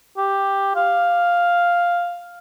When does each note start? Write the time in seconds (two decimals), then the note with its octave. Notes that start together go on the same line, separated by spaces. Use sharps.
0.17 G4
0.76 F5